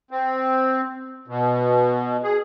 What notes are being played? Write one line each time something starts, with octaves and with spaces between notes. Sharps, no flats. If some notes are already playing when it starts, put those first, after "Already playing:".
C4
B2
G#4